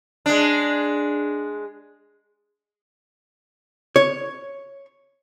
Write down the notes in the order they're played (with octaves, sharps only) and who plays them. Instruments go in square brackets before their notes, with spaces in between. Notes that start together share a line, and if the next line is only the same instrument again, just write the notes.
[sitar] G#3 D4
[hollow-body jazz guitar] C#5